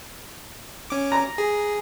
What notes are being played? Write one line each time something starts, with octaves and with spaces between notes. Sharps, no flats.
C#4 D6
A#5
G#4